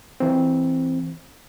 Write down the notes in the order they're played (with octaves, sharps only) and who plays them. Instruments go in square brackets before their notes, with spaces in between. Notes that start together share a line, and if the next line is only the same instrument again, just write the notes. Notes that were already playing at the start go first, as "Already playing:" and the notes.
[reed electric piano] E3 C4